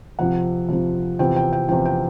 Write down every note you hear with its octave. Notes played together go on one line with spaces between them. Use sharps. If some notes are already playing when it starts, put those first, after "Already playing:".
F2 C3 F3 F#5
F2 C3 F3
E2 C3 F3 G5
G5
G5
E2 C3 F3 G5
G5